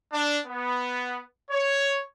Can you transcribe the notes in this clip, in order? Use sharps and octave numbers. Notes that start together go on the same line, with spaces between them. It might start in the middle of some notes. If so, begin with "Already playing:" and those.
D4
B3
C#5